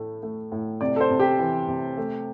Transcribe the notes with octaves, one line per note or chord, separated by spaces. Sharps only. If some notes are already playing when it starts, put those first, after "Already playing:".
Already playing: A2 A3
A3
A2
C3 D5
A4
C5
C3
G4
E3
C3
A3